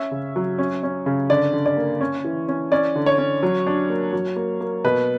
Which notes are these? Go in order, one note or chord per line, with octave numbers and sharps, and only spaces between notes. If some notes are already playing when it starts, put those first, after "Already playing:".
Already playing: C#4 E5
C#3
F#3
C#4
C#4
C#3
D3 D5
D3
D5
A#3
C#4
E3
C#4
C#4 D5
D3
C#5
C#4
F#3
D4
A#3
F#3
A#3
A#3
B2 B4